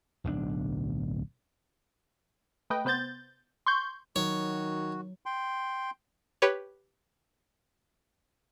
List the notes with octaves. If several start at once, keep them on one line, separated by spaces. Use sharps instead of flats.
D1 B1 A#2 D4
A3 B4 D#5 G5
C3 B3 C5 G6 A6
C6 C#6 G6
D#3 F#3 F#4 C#5
G5 C6
G4 B4 C#5